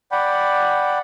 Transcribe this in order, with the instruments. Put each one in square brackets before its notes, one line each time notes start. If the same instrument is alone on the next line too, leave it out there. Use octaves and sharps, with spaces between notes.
[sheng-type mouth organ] D5 F#5 G5 B5